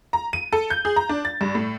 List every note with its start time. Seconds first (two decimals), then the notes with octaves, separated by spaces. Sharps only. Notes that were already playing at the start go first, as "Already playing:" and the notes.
0.13 A#5
0.33 D#7
0.52 A4
0.70 G6
0.85 G#4
0.96 A#5
1.09 D4
1.25 A6
1.41 G2
1.55 A2